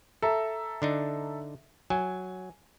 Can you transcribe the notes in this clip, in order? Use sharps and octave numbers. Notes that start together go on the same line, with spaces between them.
A4 E5 A#5
D3 D4 D#4
F#3 G#5